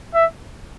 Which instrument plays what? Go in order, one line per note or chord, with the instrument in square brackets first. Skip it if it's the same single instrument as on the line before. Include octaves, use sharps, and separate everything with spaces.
[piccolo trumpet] E5